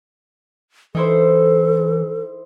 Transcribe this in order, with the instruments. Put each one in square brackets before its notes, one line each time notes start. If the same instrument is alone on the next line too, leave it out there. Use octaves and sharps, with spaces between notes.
[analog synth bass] E3 [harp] D#4 E4 C5 [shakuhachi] A4